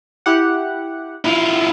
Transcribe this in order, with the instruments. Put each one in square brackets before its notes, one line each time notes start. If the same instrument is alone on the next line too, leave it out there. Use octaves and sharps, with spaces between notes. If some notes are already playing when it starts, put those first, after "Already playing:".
[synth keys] E4 G4 F#5
[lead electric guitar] E4 F4